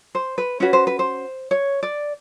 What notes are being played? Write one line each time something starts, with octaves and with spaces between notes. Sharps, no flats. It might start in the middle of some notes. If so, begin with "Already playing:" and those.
C5
B4
C#4 F#4 B4 C#5
C5
B4
C5
C#5
D5